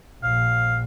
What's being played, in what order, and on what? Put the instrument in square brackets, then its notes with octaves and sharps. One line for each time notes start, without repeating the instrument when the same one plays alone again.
[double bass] A#1 [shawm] F5